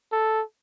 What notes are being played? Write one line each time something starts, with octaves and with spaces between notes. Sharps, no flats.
A4